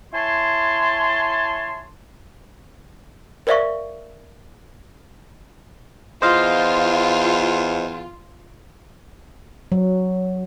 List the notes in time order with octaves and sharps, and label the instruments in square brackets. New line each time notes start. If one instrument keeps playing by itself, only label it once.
[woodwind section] E4 C#5 G#5 A5 C6
[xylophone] A#4 C5 D5 E5 F5 C#6
[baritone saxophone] E2 [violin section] F4 [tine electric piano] C5 D#5 F5
[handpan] F#3